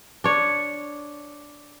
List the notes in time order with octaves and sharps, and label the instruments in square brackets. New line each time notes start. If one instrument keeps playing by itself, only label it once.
[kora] D4 C#5